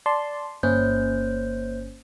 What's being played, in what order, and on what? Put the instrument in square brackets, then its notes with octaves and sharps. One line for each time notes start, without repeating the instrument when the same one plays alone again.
[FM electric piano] D5 A5 C6
[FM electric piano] G1 C#4 [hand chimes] A#3 C5 G6